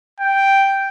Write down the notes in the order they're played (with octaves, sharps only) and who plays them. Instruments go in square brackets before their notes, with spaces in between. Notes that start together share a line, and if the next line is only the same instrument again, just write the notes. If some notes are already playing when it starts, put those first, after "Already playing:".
[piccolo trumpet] G5